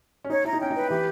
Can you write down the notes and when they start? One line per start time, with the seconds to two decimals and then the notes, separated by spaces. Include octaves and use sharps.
0.24 C#4
0.29 D#4 C#5
0.45 E4 A#5
0.53 D#4
0.60 C#4 G5
0.71 D#4
0.75 B4
0.90 E3 G4